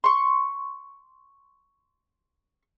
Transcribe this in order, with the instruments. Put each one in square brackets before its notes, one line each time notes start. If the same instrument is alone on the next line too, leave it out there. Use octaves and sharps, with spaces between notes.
[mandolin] C6 C#6